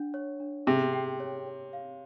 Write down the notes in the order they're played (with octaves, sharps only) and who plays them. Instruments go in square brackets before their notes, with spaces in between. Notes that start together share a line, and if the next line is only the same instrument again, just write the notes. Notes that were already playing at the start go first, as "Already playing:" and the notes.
Already playing: [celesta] D4 F#5
C#5
D4
[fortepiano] C3 [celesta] G#4
[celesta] G5
C#5
C#5
F5